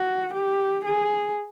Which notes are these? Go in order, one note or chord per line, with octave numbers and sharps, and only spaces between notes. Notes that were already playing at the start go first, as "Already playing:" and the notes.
Already playing: F#4
G4
G#4